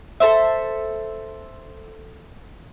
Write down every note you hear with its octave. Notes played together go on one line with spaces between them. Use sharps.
A4 A#4 C5 E5